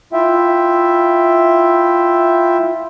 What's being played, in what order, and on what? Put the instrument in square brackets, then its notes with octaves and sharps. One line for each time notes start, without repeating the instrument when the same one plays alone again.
[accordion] E4 F4 E5 G5